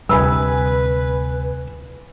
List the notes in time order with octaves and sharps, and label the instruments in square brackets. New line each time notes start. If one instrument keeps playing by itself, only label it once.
[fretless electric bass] D2 C3 G3 [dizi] B4 [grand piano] G#5 B5 E6